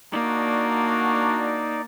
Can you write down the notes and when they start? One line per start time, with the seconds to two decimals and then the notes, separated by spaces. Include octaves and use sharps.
0.12 A#3 D4 D#4 F#4 D5